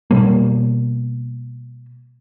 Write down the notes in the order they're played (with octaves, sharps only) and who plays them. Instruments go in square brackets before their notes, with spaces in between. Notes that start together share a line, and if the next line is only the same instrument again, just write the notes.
[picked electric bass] B2 G3 A#3